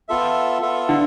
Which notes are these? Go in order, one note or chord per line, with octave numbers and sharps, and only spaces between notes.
B3 F4 A4 E5
B3 F4 A4 E5
D3